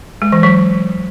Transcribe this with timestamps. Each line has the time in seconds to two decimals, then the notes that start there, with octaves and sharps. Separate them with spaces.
0.22 G#3
0.32 E3
0.43 F#3